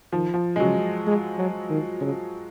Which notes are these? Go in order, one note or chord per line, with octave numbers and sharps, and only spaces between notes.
D#3 F3
F3
G#3
C#3 F#3
G#3
F#3
D#3
C#3